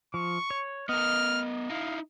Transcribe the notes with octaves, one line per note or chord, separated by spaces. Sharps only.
F3 C#6
C#5
B3 A#4 D#5 F6
D#4 E4 F5